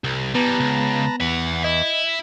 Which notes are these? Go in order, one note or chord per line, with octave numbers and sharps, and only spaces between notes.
C2
E3 G3 B3 B4 A5 A#5
C#2
E2 E5 F#5
E4 D#5